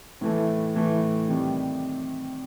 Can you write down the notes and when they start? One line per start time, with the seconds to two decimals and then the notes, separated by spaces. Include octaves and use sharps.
0.21 A2 E3 A3
0.75 A2 E3 A3
1.28 C3 D#3 G3